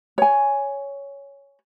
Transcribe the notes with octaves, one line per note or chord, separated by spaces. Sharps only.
C#5 G#5